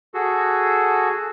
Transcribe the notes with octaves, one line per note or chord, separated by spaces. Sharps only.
F#4 G#4 A4